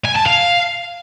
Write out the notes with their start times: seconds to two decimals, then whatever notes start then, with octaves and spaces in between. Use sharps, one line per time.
0.05 G#5
0.15 A5
0.26 F5